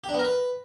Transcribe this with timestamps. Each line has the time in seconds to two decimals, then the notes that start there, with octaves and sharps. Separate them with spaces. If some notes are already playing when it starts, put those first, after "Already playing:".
0.04 G4
0.09 D4
0.14 B3
0.19 A#4
0.24 B4